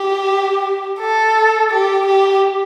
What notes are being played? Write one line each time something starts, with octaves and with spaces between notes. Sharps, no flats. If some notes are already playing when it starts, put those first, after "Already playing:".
Already playing: G4
A4
G4
G4